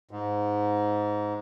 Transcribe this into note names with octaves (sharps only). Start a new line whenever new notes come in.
G#2